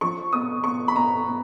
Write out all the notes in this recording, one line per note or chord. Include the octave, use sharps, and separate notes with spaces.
F3 C#6
B3 D#6
B3 C#6
B5
B3 A#5
B3